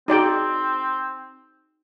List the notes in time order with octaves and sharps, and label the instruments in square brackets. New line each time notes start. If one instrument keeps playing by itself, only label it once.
[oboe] C4 [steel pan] D#4 D5 G5 [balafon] F#4 G#4